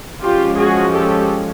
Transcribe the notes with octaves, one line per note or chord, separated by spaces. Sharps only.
F3 G#3 C#4 F4 G4
F#4 G#4
G4 A4